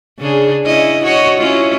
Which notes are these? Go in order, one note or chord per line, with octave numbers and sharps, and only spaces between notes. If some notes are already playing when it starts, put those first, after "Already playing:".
C#3 D4 G#4
C#4 E4 D#5
F#4 C#5 D#5
C#4 E4 F4